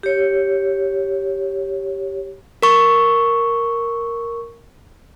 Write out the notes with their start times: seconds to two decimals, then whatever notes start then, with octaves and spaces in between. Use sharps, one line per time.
0.03 G4 C#5
2.63 A#4 C#6